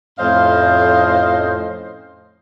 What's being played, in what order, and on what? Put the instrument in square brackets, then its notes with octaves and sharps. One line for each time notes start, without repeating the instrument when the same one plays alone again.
[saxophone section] F2 A2 C#4 C5 D#5 F5